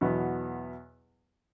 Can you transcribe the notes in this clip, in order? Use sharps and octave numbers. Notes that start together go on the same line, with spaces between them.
E2 B2 F#3 B3